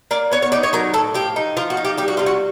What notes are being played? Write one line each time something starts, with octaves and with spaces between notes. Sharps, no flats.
A#3 D5
B3 C#5
C#5
D#4 D5
C#5
F#3 A#4
A2 A4
F3 G4
D#4
F3 F4
F#4
D#4
G4
G3 G4
F#4
C3 F4
F#4